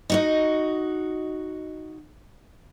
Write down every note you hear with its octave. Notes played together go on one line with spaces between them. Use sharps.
D#4 F#4 D#5